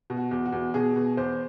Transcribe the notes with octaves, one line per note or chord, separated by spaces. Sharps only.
B2
F#4
E2
F#4
E2
B2 G#4
B2
E2 C5